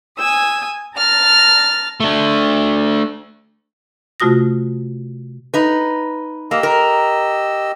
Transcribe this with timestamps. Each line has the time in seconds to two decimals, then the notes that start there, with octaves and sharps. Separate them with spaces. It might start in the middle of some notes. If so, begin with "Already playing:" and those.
0.17 G#5 D#6 E6
0.97 A5 A#5 F6 A6
2.00 A3 D4
4.20 C3 A3 F4 F#4 D#6 A#6
5.54 D#4 B4
6.51 A#3 G4 D#5 E6
6.63 A#4